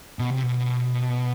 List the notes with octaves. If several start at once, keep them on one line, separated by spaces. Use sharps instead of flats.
B2
C3
B2